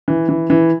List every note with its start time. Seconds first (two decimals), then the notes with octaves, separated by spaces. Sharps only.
0.08 E3
0.29 E3
0.50 E3